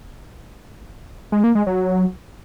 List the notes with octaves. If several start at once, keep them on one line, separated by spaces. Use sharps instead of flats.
G#3
A#3
G#3
F#3